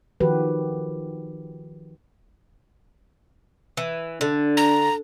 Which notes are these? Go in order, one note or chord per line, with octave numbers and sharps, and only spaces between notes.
D#3 F3 F#4 G4 B4
E3
D3 D4
A#5